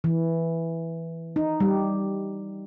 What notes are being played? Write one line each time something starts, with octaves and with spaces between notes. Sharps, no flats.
E3
D#4
G3